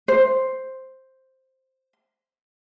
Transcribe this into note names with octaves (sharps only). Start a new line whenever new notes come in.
C5